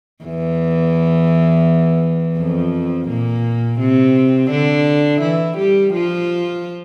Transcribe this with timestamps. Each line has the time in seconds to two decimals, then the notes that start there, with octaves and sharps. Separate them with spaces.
0.24 E2 E3
2.38 F2 F3
3.08 A#2 A#3
3.80 C3 C4
4.51 D3 D4
5.22 E3 E4
5.58 G3 G4
5.94 F3 F4